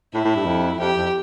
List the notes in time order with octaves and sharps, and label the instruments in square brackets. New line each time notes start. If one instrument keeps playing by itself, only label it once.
[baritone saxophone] A2 [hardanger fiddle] E4
[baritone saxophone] A2
G2
F2
[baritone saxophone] F2 [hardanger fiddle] G4
[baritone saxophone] F2